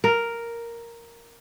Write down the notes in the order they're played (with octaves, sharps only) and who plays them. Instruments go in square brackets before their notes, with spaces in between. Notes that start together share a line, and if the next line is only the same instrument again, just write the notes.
[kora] A#4